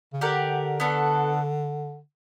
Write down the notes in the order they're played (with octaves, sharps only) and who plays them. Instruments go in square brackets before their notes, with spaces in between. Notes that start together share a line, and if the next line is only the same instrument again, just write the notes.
[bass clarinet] C#3
[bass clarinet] D3 [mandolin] G4 A#4 D5 F#5
[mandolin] B3 D4 F#4 A4